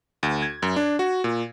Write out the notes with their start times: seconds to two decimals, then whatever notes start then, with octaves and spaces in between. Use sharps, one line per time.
0.23 D2
0.42 G#6
0.62 F#2
0.76 D4
0.99 F#4
1.24 A#2